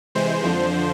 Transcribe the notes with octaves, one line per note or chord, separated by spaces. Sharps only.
C3 E3 G#3 C5
F2 D3 F3